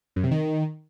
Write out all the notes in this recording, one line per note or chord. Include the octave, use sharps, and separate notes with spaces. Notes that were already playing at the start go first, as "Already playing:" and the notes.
F#2
C3
D#3